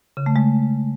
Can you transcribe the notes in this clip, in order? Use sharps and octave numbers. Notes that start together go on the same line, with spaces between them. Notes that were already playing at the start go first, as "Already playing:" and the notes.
C#3
A3
G#3